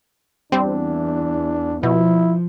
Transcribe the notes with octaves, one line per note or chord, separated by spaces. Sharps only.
E2 G3 C4 D4
B2 F3 E4